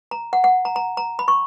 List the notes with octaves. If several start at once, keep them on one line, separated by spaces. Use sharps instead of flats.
A#5
F#5
F#5
A#5
A#5
A#5
B5
C#6